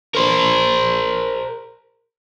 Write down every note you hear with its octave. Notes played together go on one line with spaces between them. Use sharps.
A#4 C5